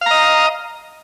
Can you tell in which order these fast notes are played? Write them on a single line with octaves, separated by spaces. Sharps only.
F5 A#5 D#5